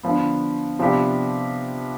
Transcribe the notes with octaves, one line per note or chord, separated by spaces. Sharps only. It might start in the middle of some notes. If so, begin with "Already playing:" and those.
D3 F3 B3
C3 F3 B3 D4 G4